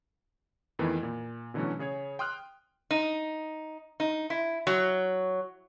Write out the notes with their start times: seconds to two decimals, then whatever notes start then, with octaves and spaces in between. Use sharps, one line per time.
0.79 F2 D#3 E3 A3 B3 E4
1.03 A#2
1.54 B2 D3 E3 F#3 A3 C#4
1.79 C#3 G#4 C#5 G#6
2.19 G5 C6 D#6 F6 F#6
2.91 D#4
4.00 D#4
4.30 E4
4.67 F#3